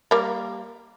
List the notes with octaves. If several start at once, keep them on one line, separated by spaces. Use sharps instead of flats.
G3 A#3